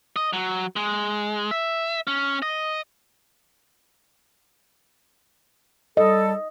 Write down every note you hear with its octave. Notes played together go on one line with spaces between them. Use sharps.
D#5
F#3
G#3
E5
C#4
D#5
G3 A4 D#5